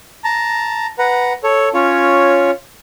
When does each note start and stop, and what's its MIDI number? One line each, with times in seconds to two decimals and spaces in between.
0.24 0.87 81
0.24 0.87 82
0.99 1.33 71
0.99 1.33 78
0.99 1.33 82
1.44 1.69 69
1.44 1.69 73
1.74 2.51 61
1.74 2.51 65
1.74 2.51 73